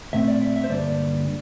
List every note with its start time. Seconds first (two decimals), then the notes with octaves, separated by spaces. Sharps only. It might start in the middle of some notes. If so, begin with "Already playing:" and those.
0.13 A#2 A3 C4 E5
0.28 D5
0.42 E5
0.56 E5
0.64 C5
0.70 G2 D3 G3 A#3 D5